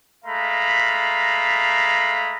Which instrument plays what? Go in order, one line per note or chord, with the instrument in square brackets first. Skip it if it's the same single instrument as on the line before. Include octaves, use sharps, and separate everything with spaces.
[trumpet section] G#3 A3 F5 A#5 B5